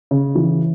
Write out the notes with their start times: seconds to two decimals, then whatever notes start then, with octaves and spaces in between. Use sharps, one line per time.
0.11 C#3
0.35 E3